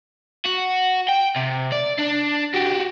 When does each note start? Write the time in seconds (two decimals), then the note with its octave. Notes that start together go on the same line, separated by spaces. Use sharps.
0.46 F#4
1.08 G5
1.36 C3
1.72 D5
1.98 D4
2.54 F#4 G4